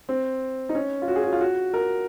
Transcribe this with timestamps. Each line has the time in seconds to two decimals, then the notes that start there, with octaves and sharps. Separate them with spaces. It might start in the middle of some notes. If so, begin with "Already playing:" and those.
0.09 C4
0.69 D#4
0.75 C#4
1.02 F4
1.08 F#4
1.16 G#4
1.24 F#4
1.33 F4
1.41 F#4
1.74 A#4